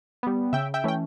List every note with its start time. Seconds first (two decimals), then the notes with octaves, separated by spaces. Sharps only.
0.23 G3 B3
0.53 C#3 E5 G5
0.74 E5 G5
0.84 E3 A3 C#4 G5